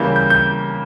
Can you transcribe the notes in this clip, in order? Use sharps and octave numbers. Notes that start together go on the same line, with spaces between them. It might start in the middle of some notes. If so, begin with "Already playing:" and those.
Already playing: C#3 E3 G3 A#3 G6
G6
G6